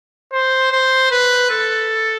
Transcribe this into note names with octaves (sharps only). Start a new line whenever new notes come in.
C5
C5
B4
A4